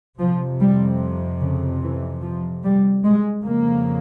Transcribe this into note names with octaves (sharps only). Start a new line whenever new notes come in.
F2 C3 F3
G3
C#3
E3
F3
G3
G#3
F2 C#3 A#3